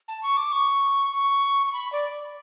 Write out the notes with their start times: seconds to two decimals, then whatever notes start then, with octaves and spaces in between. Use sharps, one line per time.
0.08 A5
0.23 C#6
0.37 D6
0.52 C#6
1.12 C#6
1.67 C#6
1.73 B5
1.93 D5